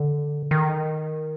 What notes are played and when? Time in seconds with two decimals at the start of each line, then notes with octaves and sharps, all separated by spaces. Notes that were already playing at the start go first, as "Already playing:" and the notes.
Already playing: D3
0.51 D#3